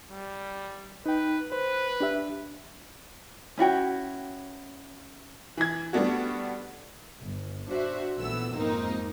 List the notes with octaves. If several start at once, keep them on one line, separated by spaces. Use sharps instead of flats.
G3
D#4 B4 G5
B4 C5
D4 G4 E5
C#4 E4 F#4 G5
E3 G#6
G3 A3 B3 D4 F#4
G1
D4 F#4 C5 E5
A#1 E3 A3 B3 E6
F2 G#2 A#3 C4 D#4